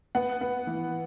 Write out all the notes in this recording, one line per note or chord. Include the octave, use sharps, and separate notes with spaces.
B3 F#5
B3
E3